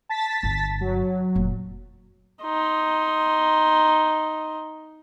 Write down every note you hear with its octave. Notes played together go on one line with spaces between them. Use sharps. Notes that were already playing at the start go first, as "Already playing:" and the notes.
A5 A6 B6
G1 G2
F#3
F1 A#2
D#4 C6